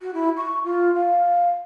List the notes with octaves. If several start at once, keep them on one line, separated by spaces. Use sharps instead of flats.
F#4
E4
C#6
F4
F5